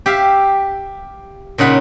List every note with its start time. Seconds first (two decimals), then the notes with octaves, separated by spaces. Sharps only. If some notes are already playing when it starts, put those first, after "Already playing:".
0.06 G4 E5 F5
1.58 A#2 C#3 D#4 F#5 B5